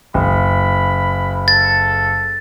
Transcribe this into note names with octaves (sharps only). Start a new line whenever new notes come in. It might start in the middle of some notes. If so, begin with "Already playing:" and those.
F#1 B5
A4 A6